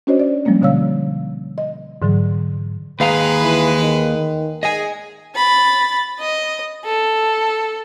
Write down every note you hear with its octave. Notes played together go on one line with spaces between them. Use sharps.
C#4 D4 F#4 C5 C#5 D#5
D5
F3 G3 G#3 A#3 C#4
B2 D3 C#5 F5 E6
D#5
G#2 D3 E3 F#3
D#2 G#3 B4 F5 A#5
E3
D#3
G#4 D#5 G#5
B5 A6
D#5
A4